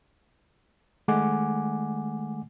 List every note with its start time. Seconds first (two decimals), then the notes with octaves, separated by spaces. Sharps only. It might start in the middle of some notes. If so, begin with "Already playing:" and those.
1.08 D#3 G#3 A3 F#5 G#5 D6